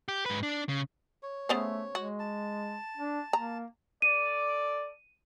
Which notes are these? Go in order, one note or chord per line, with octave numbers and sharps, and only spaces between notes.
G4
G#2 B4
D4
C#3
C#5
C#3 A3 B3 C5
G#3 F#4
A5
D4
A#3 A#5
A4 D5 D#7